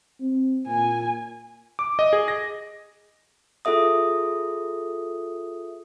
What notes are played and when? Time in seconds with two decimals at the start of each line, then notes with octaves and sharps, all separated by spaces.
0.20 C4
0.67 A#2 G#5
1.79 D6
1.99 D#5
2.13 G#4
2.28 A#6
3.65 F4 G#4 A4 E5 D#6